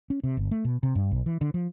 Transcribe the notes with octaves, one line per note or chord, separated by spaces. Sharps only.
C#4
C3
G1
A3
B2
C3
G2
B1
E3
D3
F3